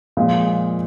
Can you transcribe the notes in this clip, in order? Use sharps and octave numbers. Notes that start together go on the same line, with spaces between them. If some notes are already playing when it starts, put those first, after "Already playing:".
A#2 F3 G#3